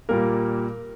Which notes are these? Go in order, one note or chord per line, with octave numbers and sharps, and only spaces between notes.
A#2 G3 A#3 A#4